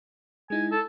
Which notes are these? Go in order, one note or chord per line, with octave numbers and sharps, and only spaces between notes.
G#3 D#4 E4 G#5
A4